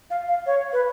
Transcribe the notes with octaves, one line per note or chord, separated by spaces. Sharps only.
F5
F5
C#5
B4